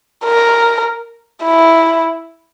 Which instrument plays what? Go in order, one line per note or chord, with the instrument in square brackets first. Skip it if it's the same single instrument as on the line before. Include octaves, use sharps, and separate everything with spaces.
[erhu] A#4
E4